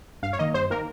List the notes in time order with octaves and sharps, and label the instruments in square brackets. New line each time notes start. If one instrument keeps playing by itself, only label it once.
[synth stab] G2 F5
C#5
D#3 A#3 D#5
G2 C5
D#3 A#3 A#4